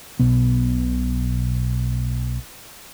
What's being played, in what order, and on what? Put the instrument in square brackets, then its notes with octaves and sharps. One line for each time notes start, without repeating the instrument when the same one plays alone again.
[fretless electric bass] B1 B2 B3